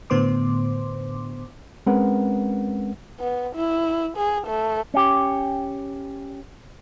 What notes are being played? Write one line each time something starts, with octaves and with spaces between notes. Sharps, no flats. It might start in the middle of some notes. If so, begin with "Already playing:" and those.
A2 D3 B3 C5 C6 D6
G#3 C4 C#4 A#4 B4 F#5
B3
E4
G#4
A3
C#4 G4